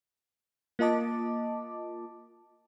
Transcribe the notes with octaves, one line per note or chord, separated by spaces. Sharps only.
A#3 F4 D#5 A5 D6